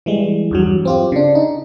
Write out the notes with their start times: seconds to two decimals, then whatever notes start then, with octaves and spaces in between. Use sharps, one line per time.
0.06 E3 G3 G#3
0.51 E2 G2 F#3
0.85 C4 F4 G4
1.12 C#3 D4
1.35 D#4